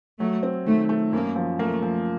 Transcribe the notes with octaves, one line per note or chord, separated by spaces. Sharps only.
F#3 A3
C4
D#3 A3
A3
F#2 A#3
F3
A3 A#3
F3